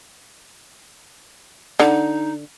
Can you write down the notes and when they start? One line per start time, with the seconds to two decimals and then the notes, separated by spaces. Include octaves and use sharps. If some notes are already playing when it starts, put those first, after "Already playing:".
1.80 D3 D#4